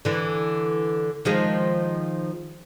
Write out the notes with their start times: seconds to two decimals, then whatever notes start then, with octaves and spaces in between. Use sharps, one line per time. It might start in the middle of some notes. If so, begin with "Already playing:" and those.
0.05 D3 E3
1.25 D#3 F3 G#3